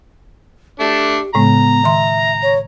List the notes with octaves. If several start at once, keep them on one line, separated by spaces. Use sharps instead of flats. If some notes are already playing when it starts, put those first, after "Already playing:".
A3 D4 G4
A2 C#3 G#3 B3 A#5
D#3 E5 C6
C#5